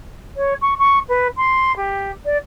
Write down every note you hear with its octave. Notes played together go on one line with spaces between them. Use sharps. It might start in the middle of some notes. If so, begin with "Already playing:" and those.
C#5
C#6
C#6
B4
C6
G4
D5